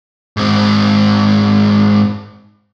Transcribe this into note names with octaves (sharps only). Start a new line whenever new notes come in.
G#2 C4